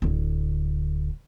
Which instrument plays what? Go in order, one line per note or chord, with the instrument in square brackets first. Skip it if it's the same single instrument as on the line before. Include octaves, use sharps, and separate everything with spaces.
[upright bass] D1 D3